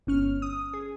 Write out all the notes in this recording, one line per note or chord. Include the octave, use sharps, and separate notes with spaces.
G1 C#4 F6
D#6
G#4